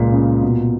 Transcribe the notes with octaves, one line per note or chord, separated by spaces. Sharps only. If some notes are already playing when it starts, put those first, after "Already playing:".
Already playing: C#2 A#2 G#3
C#3
B2